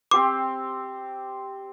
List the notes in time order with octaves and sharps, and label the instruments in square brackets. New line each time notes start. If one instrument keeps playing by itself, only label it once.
[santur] C4 G4 C5 [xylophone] D6